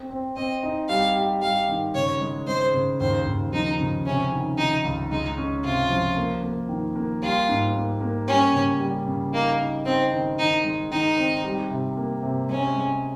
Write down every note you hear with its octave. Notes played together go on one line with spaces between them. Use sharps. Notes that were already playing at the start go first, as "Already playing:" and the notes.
Already playing: C4
C4
C4 D#5
D#4
G3 F5
G4
G3 F5
D#3
C#3 C#5
G#3
G#3 C5
C#3
D#2 C5
D#2
F3 D#4
C#3
C3 C#4
D#3
D#3 D#4
C#2
G#3 D#4
C#4
C3 F4
F3
A#3
A#3
D#3
A#3
G3 F4
G#2
A#3
A#3
G3 C#4
C#3
G3
C#3
A#3 D#4
D#4
C4 D#4
D#3
D#3 D#4
G#3
D#3 D#4
C4
G3
C3
A#3
C3
G#3 C#4
G#3